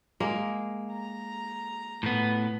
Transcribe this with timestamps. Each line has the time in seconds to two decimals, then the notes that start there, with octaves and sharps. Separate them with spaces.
0.20 G#3 A#3
0.92 A#5
2.03 A2 B3